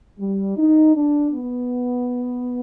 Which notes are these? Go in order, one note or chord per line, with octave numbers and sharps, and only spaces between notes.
G3
D#4
D4
B3